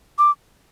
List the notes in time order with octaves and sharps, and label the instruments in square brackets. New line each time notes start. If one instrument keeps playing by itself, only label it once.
[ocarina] D6